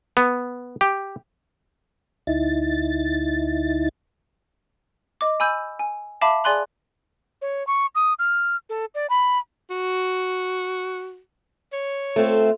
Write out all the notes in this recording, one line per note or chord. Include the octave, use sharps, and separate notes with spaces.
B3
G4
D2 D#4 E4 A6
D#5 D6
G#5 B5 E6 G6 D#7
G#5
E5 F5 A5 B5 D6
G#4 D5 G#5 C6 F#6 F#7
C#5
C#6
D#6
F6
A4
D5
B5
F#4
C#5
A3 C4 F4